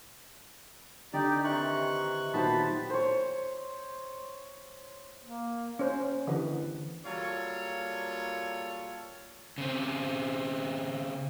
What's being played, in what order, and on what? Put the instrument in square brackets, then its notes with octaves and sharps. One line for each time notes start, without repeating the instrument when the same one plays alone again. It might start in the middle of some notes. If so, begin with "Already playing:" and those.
[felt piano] D3 [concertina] D#4 G4 D5
[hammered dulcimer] C3 D#3 E3 [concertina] C#6 F#6
[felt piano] A#2 D#3 F#3 [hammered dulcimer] B3 G4 C5 [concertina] A5 B5
[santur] C5 C#5
[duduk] A#3
[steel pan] C#4 C5
D3 E3 G4 B4
[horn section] F#3 G3 A#3 F4 A4 C#5
[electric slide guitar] C#3 C4